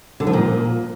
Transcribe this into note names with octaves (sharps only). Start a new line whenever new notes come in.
D3
F3
A#2